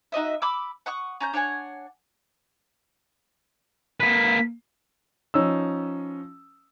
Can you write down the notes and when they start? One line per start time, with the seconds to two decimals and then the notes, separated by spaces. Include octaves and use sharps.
0.12 D#4 F#4 D#5 E5
0.42 B5 D6 E6
0.86 F#5 C#6 D#6
1.20 C#4 A#5 G6
1.33 D4 C#5 F#5 G#5
4.00 A#3 B4 B6
5.34 F3 C#4 D#4 E6